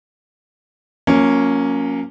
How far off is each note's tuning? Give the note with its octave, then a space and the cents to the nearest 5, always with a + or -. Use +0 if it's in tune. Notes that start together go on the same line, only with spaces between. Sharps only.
F#3 -45 A#3 +0 C#4 +0